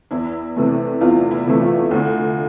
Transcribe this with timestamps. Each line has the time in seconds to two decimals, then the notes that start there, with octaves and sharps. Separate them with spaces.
0.11 E2 E4
0.57 C3 E3 A3
1.01 E2 F4
1.31 E4
1.46 C3 E3 A3
1.61 F4
1.91 D2